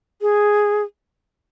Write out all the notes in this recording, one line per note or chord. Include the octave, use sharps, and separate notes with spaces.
G#4